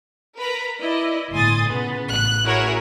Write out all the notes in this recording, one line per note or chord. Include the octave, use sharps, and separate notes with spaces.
A#4 B4 A#5 B5
E4 D5 D#5
G1 A2 G#5 C6 D#6 A6
A#2 C#3 B3
A1 F#6
E4 F#4 G#4 A#4 C#5